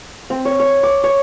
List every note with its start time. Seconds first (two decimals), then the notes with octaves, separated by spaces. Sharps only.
0.30 C4
0.45 C#5
0.60 C#5
0.83 D6
1.04 C#5